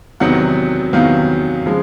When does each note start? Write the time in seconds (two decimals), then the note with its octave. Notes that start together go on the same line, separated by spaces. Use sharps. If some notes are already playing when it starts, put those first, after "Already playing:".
0.20 E2 C3 D#3 F#3 B3 F#5
0.93 E2 C3 D#3 F#3 B3 F5
1.66 C#3 F3 G#3